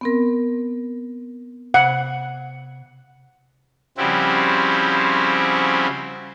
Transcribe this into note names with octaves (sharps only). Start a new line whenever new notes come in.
B3 C4 A#4
C3 F#5
C#3 F3 G3 C4 E4 F#4